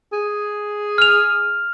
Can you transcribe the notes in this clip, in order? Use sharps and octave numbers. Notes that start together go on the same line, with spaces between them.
G#4
F6 F7